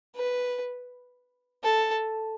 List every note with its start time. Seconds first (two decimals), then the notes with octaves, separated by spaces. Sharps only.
0.16 B4
1.63 A4